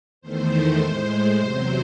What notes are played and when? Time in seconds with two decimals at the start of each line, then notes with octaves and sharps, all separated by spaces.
0.21 E2 D#3 A3 C5
0.80 A2 G#3 C5
1.37 E2 C3 F#3